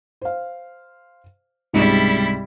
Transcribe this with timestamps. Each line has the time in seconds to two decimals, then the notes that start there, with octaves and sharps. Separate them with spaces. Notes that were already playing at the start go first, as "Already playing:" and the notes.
0.22 C5 F5
1.73 C#2 G#2 C3 G3 E4